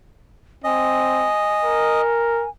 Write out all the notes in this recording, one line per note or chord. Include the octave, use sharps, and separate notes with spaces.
C4 D#5 G#5
A#4